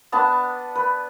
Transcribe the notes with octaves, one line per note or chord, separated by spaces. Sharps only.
B3 D4 A5
B4